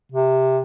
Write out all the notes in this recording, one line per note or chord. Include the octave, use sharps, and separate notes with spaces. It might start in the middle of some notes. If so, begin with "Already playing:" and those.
C3